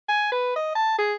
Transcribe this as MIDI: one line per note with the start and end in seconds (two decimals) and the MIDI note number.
0.08 0.29 80
0.32 0.54 71
0.56 0.71 75
0.75 0.95 81
0.98 1.14 68